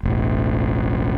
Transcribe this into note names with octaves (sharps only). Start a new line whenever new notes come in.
E1 A1